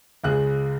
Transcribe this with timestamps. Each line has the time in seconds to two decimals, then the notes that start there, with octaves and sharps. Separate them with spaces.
0.24 C#2 C#3 G#3 F#6